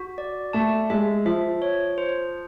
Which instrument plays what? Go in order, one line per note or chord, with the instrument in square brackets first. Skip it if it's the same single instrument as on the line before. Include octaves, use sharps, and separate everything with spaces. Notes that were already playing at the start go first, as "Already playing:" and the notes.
Already playing: [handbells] F#4
D5
[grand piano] A3 [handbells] A5
[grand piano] G#3 [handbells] E5
[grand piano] F3 [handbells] E5
[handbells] C#5
C5